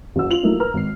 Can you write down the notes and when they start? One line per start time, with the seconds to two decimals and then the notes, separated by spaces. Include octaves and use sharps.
0.16 F#1 F#4 E6
0.30 F4 F7 F#7
0.43 F3 F#3 A3 A#3 D#4 E4
0.60 A#4 B4 A#5 F6
0.74 G#1 C7